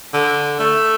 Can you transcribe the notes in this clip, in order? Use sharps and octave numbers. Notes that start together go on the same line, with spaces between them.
D3
A3